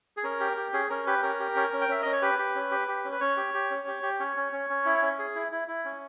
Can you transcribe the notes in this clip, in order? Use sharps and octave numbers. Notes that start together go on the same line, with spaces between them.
G#4
C#4 A#4
G4
G4
C#4 G#4
C#4 A#4
G4 B4
C#4 A#4
G4
C#4
C#4
G5
C#4 E5
C#4 D#5
C#5
G4 B4
G4
C#4
G4
G4
C#4
B4
C#4 C#5
G4
G4
C#4
G4
G4
C#4 C#5
C#4
C#4
C#4
E4
C#4
G#4
E4
E4
E4
C#4